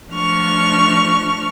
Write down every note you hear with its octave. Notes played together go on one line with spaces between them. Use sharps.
F3 A3 D4 C#6 F6